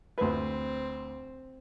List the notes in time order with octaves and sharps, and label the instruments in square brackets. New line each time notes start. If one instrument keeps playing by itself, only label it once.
[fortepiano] D2 B4 [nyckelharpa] C4